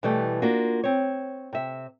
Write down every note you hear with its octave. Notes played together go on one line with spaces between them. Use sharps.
B2 E3 G3 A3
A#3 D4 F4 F#4
C4 C#5
C3 E5